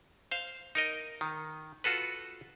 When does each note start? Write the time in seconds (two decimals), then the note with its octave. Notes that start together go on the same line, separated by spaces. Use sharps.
0.31 C5 F5
0.75 D#4 A#4 D#5
1.21 D#3
1.84 F4 F#4 A4 B4